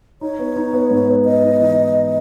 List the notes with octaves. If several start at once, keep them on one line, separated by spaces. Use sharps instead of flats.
D#4 C#5
B3
D#4
B3
G#2
B3
B3 D#5
D#4
E3